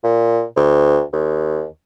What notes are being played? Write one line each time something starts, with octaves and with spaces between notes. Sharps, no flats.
A#2
D2
D#2